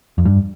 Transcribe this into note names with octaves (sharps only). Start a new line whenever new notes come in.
F2
G2